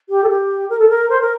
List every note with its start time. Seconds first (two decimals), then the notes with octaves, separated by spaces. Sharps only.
0.09 G4
0.23 A4
0.28 G4
0.69 A#4
0.79 A4
0.89 A#4
1.09 C5
1.20 A#4